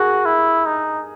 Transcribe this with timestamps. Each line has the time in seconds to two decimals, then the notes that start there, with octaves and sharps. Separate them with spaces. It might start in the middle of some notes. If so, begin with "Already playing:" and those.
Already playing: F#4 G#4 A#4
0.26 E4
0.66 D#4